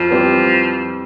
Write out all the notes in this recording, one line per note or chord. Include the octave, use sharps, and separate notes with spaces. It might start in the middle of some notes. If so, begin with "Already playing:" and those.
Already playing: F2 F3
E3 G3 C4 G4